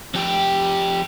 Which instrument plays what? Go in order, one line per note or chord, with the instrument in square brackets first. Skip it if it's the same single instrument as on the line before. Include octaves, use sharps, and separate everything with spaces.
[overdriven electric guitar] F2 G4